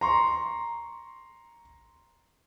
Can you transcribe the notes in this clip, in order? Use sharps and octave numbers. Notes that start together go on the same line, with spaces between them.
A#5 C6 C#6